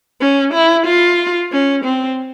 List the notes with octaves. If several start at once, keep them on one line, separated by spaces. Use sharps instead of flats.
C#4
E4
F4
C#4
C4